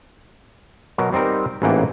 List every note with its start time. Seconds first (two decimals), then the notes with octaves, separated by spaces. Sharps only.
0.98 B2 F#3 A#4
1.12 G3 C4 D#4 A#4
1.62 A1 G#2 E3 A#3 F#5 G5